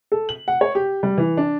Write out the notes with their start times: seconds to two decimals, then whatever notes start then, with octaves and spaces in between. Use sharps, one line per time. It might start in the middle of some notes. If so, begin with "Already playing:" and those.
0.12 A4
0.29 F#7
0.48 F#5
0.61 C#5
0.75 G4
1.03 G3
1.18 E3
1.37 D4